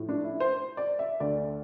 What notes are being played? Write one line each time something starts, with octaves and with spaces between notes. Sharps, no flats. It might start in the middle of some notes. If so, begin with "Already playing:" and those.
Already playing: A2 F3 A3
D4
E4
C5
D5
E5
D2 D3 A3 D5